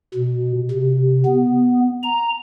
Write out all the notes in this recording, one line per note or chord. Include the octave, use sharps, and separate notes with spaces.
B2
C3
B3
A#5